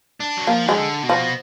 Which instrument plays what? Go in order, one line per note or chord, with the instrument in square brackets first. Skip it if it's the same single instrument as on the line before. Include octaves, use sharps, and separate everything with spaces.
[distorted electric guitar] D4
F#3
[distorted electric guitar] F3 [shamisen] A#3
[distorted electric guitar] D#3 [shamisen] G#3
[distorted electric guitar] D3
B2
[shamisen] F3